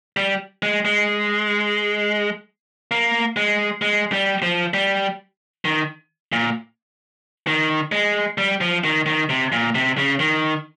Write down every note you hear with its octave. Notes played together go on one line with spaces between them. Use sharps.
G3
G#3
G#3
A#3
G#3
G#3
G3
F3
G3
D#3
A#2
D#3
G#3
G3
F3
D#3
D#3
C3
A#2
C3
C#3
D#3